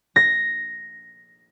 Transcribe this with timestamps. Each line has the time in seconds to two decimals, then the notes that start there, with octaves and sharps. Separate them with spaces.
0.16 A#6